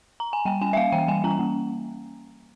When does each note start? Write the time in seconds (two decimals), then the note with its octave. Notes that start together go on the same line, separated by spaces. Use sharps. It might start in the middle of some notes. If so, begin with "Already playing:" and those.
0.20 A#5
0.33 G#5
0.45 G3 G5
0.61 C#4 G#5
0.73 E5
0.77 A#3 F5
0.92 E3 G5
1.08 G3 G#5
1.24 C#4 A#5
1.39 A#3